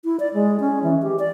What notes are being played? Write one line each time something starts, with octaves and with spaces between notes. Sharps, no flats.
E4
D5
G#3
C#4
E3
G4
D5